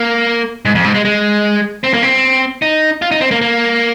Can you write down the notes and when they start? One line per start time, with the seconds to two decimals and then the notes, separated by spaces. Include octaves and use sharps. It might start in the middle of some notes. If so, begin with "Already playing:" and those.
Already playing: A#3
0.65 G#2
0.75 F2
0.84 G#2
0.95 G#3
1.05 G#3
1.84 C4
1.94 A#3
2.03 C4
2.62 D#4
3.02 F4
3.11 D#4
3.21 C4
3.31 A#3
3.41 A#3